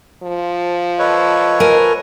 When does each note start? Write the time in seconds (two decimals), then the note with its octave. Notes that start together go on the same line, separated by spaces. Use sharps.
0.23 F3
0.99 A4 B4 C#5 D#5
1.60 A#4 G#5